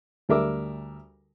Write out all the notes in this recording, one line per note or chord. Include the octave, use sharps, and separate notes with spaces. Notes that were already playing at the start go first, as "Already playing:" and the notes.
D2 G3 A#4 E5 D6